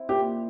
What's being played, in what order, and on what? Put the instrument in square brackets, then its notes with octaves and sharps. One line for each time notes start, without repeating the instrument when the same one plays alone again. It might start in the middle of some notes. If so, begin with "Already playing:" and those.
Already playing: [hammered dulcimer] C4 E4
[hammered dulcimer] A#2 [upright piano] G4